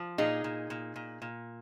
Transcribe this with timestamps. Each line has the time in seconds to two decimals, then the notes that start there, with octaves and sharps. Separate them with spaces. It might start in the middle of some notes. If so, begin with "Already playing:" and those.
Already playing: F3
0.18 A#2 D#4 G#4
0.44 A#2
0.70 A#2
0.96 A#2
1.22 A#2